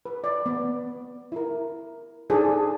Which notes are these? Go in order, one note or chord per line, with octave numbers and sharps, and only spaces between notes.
B4
D5
B3
E4 A#4
D4 D#4 G#4 A4 C5 D5